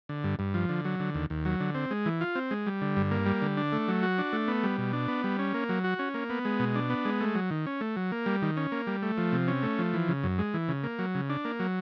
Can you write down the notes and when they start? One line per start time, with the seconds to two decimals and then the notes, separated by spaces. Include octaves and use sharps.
0.09 D3
0.24 G2
0.39 G2
0.54 F3
0.69 D3
0.85 F#3
1.00 D3
1.15 D#2
1.30 D#2
1.45 F#3
1.60 D3
1.75 C4
1.91 G#3
2.06 E3
2.21 F4
2.35 C4
2.51 G#3
2.66 G3
2.82 D3
2.96 G2
3.11 A#3
3.26 G3
3.42 D3
3.57 D4
3.72 A3
3.88 F#3
4.03 F#4
4.18 D4
4.33 A3
4.48 B3
4.63 G3
4.78 B2
4.93 D4
5.08 B3
5.24 G3
5.39 C#4
5.54 A#3
5.69 F#3
5.84 F#4
5.99 C#4
6.14 A#3
6.30 B3
6.45 G#3
6.59 B2
6.76 D4
6.90 B3
7.05 G#3
7.20 A3
7.35 F#3
7.51 D#3
7.66 C#4
7.81 A3
7.96 F#3
8.12 A#3
8.26 G3
8.42 D#3
8.57 C#4
8.72 A#3
8.87 G3
9.02 A3
9.18 F3
9.32 C3
9.48 C#4
9.63 A3
9.79 F3
9.94 E3
10.08 C#3
10.23 F#2
10.39 G#3
10.54 E3
10.68 C#3
10.84 A#3
10.99 F#3
11.15 C#3
11.30 D4
11.45 A#3
11.59 F#3